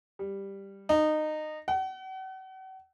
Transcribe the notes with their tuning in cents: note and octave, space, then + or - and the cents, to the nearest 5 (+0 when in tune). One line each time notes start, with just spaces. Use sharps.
G3 +5
D#4 -20
F#5 +40